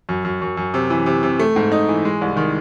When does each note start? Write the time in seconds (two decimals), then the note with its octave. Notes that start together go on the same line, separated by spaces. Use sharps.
0.09 F#2
0.25 F#2
0.42 F#2
0.57 F#2
0.74 C3
0.90 E3
1.06 C3
1.23 C3
1.40 A3
1.56 G#2
1.72 D#4
1.88 E3
2.05 G#3
2.21 C2
2.37 D#3